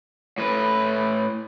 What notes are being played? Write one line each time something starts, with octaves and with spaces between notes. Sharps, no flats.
A2 B4